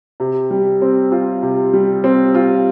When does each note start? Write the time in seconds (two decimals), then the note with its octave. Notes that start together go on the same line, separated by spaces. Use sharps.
0.20 C3
0.51 G3
0.82 C4
1.12 F4
1.42 C3
1.73 G3
2.04 C4
2.35 F4